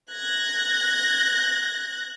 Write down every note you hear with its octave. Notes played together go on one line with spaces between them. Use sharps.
F#6 G#6 A#6